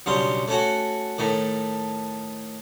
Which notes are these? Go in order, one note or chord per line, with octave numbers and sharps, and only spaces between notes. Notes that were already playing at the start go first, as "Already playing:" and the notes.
B1 G2 C#3 C6
A3 C#4 F#4
A2 D#3 A3